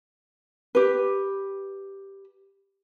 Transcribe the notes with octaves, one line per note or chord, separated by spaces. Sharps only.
G4 B4